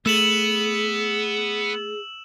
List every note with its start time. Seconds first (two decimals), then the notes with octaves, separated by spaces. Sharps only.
0.06 A3 B3 G#4 E6 E7 F#7